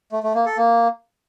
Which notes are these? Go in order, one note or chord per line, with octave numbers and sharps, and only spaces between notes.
A3
A3
A#3
A4
A#3